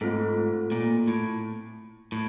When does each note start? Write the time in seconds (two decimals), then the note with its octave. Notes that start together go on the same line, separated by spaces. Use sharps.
0.01 G#2 A3 C4 F4 A4
0.72 A#2
1.07 A2
2.12 A2